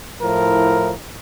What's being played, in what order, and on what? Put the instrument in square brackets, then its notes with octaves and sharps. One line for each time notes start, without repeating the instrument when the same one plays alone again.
[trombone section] A2 F3 E4 A#4